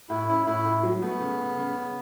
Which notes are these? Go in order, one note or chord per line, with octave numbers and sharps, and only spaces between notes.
A2 E4
C#4 E4
A2 E4
A2
F#3
A3 B3
C#3
C#3
C#3
C#3